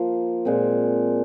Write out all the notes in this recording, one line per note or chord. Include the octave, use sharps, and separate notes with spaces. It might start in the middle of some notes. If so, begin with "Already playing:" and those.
Already playing: F3 A#3 F4
A#2 G#3 C4